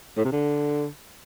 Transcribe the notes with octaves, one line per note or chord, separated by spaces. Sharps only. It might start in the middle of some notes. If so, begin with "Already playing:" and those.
A2
C3
D3